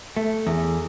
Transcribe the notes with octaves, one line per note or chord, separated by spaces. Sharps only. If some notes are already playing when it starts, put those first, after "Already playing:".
A3
E2